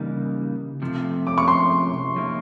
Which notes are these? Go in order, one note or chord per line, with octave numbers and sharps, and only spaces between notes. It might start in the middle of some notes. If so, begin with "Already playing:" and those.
Already playing: C#3 E3 G3 A#3 D#4
C3 F3 A3
D6
C#6
C6
F3 A#3 D#4